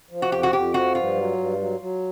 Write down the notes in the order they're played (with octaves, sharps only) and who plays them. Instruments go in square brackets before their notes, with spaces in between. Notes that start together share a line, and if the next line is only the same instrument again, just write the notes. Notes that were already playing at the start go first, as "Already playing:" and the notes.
[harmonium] F3
[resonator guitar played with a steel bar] F#4
[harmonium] F2 [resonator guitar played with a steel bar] G4
[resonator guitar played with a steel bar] F#4
[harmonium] F2 [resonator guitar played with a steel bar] G4
[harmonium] F3 [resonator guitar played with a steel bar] F#4
[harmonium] G2 [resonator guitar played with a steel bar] F4
[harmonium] F#3
G2
F#3
F#3